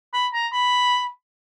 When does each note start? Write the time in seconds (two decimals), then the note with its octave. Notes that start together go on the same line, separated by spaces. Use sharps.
0.13 B5
0.34 A#5
0.53 B5